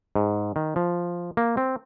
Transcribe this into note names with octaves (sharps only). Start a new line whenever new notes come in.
G#2
D#3
F3
A#3
C4